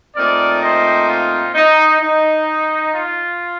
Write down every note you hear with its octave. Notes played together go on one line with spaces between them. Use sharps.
A#2 A3 C4 D#4 A#4 D5
C5 D#5
F4
D#4
D#4
F4